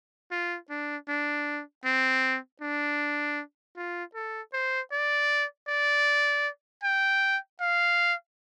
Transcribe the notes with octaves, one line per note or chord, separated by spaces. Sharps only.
F4
D4
D4
C4
D4
F4
A4
C5
D5
D5
G5
F5